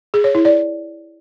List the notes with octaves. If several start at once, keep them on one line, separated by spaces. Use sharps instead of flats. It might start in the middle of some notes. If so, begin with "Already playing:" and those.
G#4
C#5
E4
D5